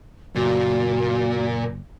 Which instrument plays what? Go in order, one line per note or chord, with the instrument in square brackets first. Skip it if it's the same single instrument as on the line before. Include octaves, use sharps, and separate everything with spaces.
[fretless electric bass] F#1 [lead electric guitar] A#2 [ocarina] F#4